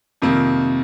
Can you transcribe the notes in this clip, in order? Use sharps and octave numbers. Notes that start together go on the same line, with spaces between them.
F2 C3 D#3 A#3